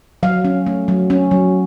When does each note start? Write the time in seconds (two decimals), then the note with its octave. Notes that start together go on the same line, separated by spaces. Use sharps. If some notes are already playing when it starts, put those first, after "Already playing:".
0.23 F#3 F5
0.45 C#4
0.67 A3
0.88 F#3
1.10 C#4
1.31 F#3